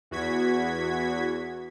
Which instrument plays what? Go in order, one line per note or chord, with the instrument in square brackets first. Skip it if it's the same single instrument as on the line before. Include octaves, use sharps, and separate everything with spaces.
[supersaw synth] E2 F#4 G#6 B6